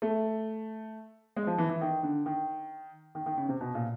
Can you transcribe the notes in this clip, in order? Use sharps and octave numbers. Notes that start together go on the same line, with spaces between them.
A3
G#3
F3
E3
E3
D#3
D3
D#3
D#3
D#3
C#3
C3
B2
A#2